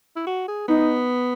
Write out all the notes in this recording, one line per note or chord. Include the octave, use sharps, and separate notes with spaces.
E4
F#4
G#4
B3 D#4